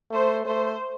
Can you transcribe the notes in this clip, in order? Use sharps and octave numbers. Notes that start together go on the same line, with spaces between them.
A3 C5
A3 C5